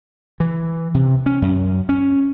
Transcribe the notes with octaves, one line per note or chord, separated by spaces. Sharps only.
E3
C3
C#4
F#2
C#4